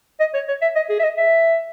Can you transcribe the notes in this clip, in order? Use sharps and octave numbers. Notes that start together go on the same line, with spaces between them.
D#5
C#5
C#5
E5
D#5
G#4
E5
D#5
E5